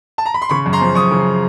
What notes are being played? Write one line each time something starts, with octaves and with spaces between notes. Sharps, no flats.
A5
A#5
B5
C6
C#3 B5 C#6
F#2
A#5 C6
F3
F#2 C#6 D#6
C#3